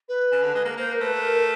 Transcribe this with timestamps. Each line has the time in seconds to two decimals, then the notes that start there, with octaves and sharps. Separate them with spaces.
0.08 B4
0.32 C#3
0.43 D3
0.55 G#3
0.65 A#3
0.77 A#3 C5
0.91 A#4
1.00 A3 B4
1.15 B4
1.23 A#4